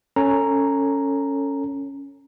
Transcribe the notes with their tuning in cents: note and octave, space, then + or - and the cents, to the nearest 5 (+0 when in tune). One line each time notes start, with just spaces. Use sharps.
C#4 +0 A4 +25 A#5 +0